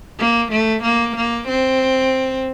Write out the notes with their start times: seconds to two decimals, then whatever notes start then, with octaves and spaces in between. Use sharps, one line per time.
0.19 A#3
0.52 A3
0.83 A#3
1.16 A#3
1.48 C4